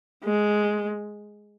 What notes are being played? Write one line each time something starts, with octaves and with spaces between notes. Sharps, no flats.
G#3